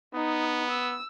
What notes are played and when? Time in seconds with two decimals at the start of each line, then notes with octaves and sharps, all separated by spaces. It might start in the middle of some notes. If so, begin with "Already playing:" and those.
0.14 B3 D#4
0.70 E6